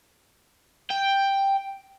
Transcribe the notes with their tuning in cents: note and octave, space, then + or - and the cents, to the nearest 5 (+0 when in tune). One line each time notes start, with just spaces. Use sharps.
G5 +5